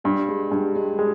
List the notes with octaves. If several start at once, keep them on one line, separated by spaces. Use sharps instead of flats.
G2 G3
G#3
G2 G3
G#3
G3 G#3